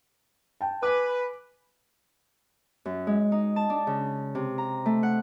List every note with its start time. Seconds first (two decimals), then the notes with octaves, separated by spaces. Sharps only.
0.61 G5 A5
0.83 B4 G#5 D6
2.85 F#2
3.07 G#3
3.32 D#4
3.56 A5
3.70 D4
3.87 C#3
4.35 C3
4.58 A#5
4.86 A3
5.03 F#5